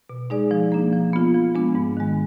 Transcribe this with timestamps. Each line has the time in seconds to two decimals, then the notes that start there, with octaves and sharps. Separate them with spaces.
0.09 B2
0.30 G#3 D#4 G#4 D5
0.51 F3
0.72 A#3 D4
0.93 F3
1.13 B3 F4
1.34 F3
1.55 G#3 B3 D4
1.75 G#2
1.97 D#3 G#3